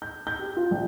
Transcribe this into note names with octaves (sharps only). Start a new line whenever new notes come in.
G6
G6
G4
F4
A#1